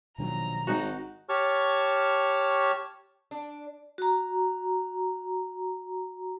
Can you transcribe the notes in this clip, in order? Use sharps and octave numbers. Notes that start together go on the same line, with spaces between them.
A#1 B2 D#3 F#3 A#5
G#1 D#4 F#4
G4 C#5 A5 C#6 F6
D4
F#4 A#5